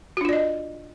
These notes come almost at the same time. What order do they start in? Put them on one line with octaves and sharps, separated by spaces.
F#4 D4 F4 D5 D#5